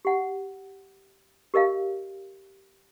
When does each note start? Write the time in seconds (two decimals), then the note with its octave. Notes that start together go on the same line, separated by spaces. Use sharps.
0.05 G4 F#5
1.54 G4 A#4 D#5 F5